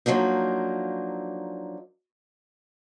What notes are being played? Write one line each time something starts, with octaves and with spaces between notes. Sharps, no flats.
F3 F#3 A#3 D4 D#4